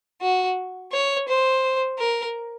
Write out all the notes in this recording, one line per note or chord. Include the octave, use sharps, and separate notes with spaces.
F#4
C#5
C5
A#4